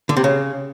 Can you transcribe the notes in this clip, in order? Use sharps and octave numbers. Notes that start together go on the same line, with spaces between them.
D3
C3
C#3